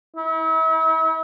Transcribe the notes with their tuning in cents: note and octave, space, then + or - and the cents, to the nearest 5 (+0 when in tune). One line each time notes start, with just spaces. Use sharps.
E4 -40